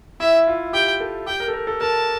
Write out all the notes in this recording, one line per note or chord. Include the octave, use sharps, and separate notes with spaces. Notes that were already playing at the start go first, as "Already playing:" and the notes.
E4 E5
F4
G4 G5
A4
G4 G5
A#4
A4
A#4
A4
A#4 A5